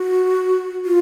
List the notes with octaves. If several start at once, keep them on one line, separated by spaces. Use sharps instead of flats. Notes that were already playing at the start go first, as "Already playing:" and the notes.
Already playing: F#4
F4